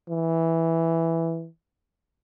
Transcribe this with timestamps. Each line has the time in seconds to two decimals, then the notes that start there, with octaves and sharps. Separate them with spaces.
0.08 E3